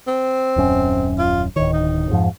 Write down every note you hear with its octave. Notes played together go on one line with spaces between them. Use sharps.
C4
D#1 F#2 C#4
F4
D1 D#3 C#5
D#4
F2 G#2 F3